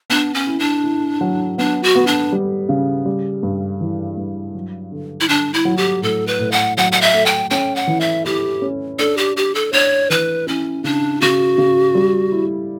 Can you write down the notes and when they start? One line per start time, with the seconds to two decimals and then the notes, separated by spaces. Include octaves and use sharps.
0.10 B3 D4
0.34 C#4
0.47 E4
0.60 D4
0.84 E4
1.21 F#3
1.58 B3 D4
1.83 F#4
1.95 B3
2.07 D4
2.32 G3
2.69 C#3
3.06 G3
3.43 G2
3.81 E3
4.17 G2
4.55 F#3
4.92 D3
5.21 E4
5.28 D3 D4
5.54 E4
5.65 F#3
5.77 G4
6.02 A2 A4
6.27 B4
6.39 A2
6.52 F#5
6.77 F#3 F#5
6.92 F#5
7.01 E5
7.14 A3
7.26 G5
7.51 C#4 G5
7.76 F#5
7.87 E3
8.01 E5
8.25 E4 G4
8.62 C#4
8.99 D4 A4
9.17 G4
9.36 D4 G4
9.55 A4
9.73 D4 C#5
10.10 E3 B4
10.48 C#4 E4
10.84 C#3 D4
11.21 C#3 F#4
11.58 C#3
11.95 G3
12.32 E4